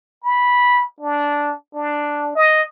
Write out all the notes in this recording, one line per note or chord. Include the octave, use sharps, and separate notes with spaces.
B5
D4
D4
D#5